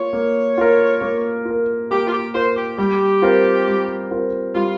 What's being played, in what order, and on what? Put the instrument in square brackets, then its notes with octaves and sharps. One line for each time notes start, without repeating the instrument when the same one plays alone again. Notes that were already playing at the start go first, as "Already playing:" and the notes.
Already playing: [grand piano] A#3 F4 A#4 [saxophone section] C#5
[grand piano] A#3
F4 A#4
A#3
F4
A#4
[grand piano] A#3 [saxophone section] G4
[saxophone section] F4
G4
[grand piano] F4 A#4 [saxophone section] C5
[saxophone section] G4
[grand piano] G3 [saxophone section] G4
[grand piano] C4 F4 A#4
G3
C4 F4 A#4
[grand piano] G3 [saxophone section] F4